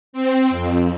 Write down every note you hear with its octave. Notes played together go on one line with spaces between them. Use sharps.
C4
F2